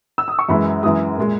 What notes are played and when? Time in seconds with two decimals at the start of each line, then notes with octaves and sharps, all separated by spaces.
0.18 E6
0.28 D#6
0.39 C#6
0.49 F#2 E3 G#3 B5
0.83 F#2 E3 G#3 D#6
1.18 A#2 G#3